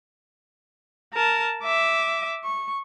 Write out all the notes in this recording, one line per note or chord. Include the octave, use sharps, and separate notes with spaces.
A#4 A5
E5 D6
C#6